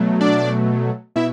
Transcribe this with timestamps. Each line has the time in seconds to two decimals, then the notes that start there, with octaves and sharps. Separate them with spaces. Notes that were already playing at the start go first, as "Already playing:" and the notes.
Already playing: B2 F#3 A3
0.21 D4 D5
1.16 B2 E4 E5